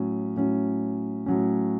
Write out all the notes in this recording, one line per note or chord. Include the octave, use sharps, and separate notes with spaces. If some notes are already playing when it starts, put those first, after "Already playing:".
Already playing: A2 F#3 C#4
A2 F#3 C#4
A2 F#3 C#4